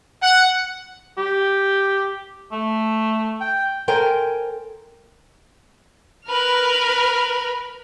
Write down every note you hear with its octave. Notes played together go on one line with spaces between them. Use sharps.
F#5
G4
A3
G5
A4 A#4 C5 G5 G#5
A#4 B4 F6